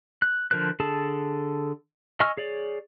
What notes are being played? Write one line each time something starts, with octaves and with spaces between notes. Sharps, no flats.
F#6
D3 F3 A#4 C5 F#6
D3 G#4 A4 A5
D#5 G#5 C#6 E6 F6
G#4 C#5 D5